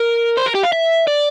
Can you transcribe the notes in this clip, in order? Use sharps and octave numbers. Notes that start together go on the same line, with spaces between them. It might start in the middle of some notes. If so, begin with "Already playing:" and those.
Already playing: A#4
C5
A#4
G4
F5
E5
D5